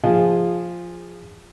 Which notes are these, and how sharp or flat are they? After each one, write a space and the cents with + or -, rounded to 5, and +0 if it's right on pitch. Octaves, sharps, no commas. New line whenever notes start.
F3 +0 F4 +0 G#4 -20